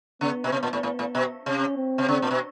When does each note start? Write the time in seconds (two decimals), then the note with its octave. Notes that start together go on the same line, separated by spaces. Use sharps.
0.21 C#3 B3
0.44 B2
0.52 C3 B3
0.63 A#2
0.73 A2
0.83 A2
0.99 A2
1.15 B2
1.45 C3 C#4
1.77 C4
1.98 C3
2.09 C#3
2.22 A#2
2.31 B2